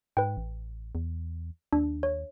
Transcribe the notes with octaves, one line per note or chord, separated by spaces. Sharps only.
G#2 B4 G5
A1
E2
D#2 D4
C#5